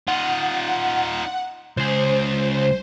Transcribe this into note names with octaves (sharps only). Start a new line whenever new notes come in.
D#4 F4 F#5
C#2 G#4 C5